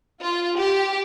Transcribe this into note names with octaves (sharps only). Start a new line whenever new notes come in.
F4
G4